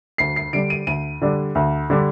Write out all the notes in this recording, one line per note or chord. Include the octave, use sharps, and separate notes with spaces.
D2 C7
C7
D3 G3 D4 D7
D#7
D2 D#7
D3 G3 D4
D2
D3 G3 D4